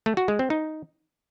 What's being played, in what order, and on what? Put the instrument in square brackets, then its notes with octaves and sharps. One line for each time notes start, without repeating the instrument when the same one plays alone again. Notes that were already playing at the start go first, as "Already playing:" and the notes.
[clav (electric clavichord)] A3
F#4
G#3
C4
D#4